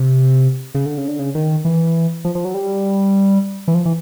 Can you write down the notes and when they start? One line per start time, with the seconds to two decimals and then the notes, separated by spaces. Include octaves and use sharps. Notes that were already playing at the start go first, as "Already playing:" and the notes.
Already playing: C3
0.75 C#3
0.86 D3
0.98 C#3
1.08 D3
1.19 C#3
1.35 D#3
1.65 E3
2.25 F3
2.35 F3
2.45 F#3
2.54 G3
3.68 E3
3.74 F3
3.85 E3